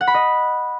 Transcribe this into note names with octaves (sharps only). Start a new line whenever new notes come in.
F#5
B5
D#5